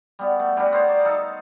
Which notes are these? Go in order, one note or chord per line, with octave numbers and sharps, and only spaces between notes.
G3 B3 F#4
A3
G3 D4 F#4 B4
B3 A#4 C5 C#5
D5
D#4 A4 F5